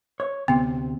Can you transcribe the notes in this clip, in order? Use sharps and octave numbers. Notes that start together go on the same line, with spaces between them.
C#5
D2 C3 B3